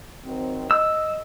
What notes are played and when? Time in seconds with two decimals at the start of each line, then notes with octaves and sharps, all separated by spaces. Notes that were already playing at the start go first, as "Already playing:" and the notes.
0.24 D#3 F#3 C4
0.71 D#5 E6